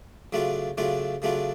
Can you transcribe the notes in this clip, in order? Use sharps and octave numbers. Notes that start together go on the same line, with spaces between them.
C#3 F#3 A3 D4 F4
C#3 F#3 A3 D4 F4
C#3 F#3 A3 D4 F4